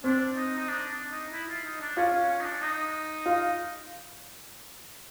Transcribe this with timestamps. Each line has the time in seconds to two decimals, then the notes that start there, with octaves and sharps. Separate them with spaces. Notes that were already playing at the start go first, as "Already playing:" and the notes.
0.04 C4 D4
0.36 D#4
0.59 D#4
0.69 D4
0.89 D4
1.11 D#4
1.32 E4
1.49 F4
1.65 D#4
1.81 D4
1.97 C#4 F4
2.14 C#4
2.29 C#4
2.41 D#4
2.45 D4
2.62 D#4
3.26 F4